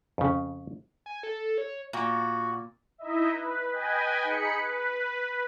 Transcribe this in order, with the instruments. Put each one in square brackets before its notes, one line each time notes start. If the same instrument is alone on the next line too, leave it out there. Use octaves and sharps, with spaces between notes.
[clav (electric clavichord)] F2 C#3
[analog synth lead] G#5
A4
C#5
[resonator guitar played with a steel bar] A#2 [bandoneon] F#4
[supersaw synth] D#4 E4 D#5 E5
B4
B4 D#5 G5 G#5
D#4 G#4 B5 C#7
B4